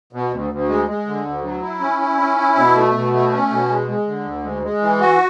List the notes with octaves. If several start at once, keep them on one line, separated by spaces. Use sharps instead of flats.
B2
D2
D2
G#3
G#3
D3
D2
F#3
E4
C#4
E4
C#4
E4
B2
A3
B2
A3
C#4
B2
G#3
G#3
D3
D2
G#3
G#3
E3
F#4